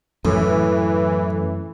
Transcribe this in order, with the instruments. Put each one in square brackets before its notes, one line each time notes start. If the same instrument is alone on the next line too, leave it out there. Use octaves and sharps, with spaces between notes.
[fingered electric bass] F#2 [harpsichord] A2 [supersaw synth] E3